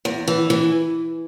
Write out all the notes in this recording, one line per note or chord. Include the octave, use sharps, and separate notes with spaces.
E2
E3
E3